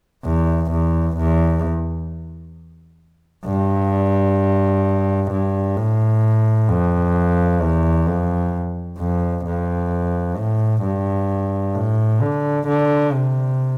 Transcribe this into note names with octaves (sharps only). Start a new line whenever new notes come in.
E2
E2
E2
G2
G2
A2
F2
E2
F2
F2
F2
A2
G2
A2
D3
D3
C3